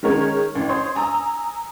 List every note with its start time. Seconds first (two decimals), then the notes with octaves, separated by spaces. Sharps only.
0.03 D#3 G#3 C#4 A#4 C#5
0.55 A1
0.69 C5 C#5 C6 D#6
0.95 G#5 A#5 D#6 E6